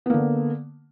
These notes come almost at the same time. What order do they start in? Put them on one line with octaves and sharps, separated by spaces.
B3 A#3 D3